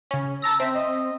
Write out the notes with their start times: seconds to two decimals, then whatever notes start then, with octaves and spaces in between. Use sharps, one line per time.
0.11 C#3 C#4
0.42 A5 A#5 E6 A#6
0.60 C4 E5
0.74 D#5